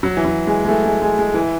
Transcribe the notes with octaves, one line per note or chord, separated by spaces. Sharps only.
F#3
E3
F#3
G#3
G#3
A3
G#3
G#3
G#3
E3